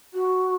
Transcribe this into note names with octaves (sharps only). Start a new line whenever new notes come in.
F#4